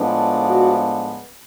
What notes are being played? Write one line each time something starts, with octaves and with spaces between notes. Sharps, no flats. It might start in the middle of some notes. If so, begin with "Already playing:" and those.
Already playing: A2 F3 G#3 B3 D4
F#4